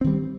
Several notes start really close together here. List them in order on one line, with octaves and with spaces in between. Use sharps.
C4 D#3 G3